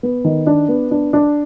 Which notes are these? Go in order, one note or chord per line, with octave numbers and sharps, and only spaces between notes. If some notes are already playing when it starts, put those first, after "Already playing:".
B3
D#3
D4
B3
D4
D4